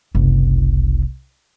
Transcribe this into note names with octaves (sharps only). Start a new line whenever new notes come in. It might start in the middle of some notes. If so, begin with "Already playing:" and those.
F#1 C2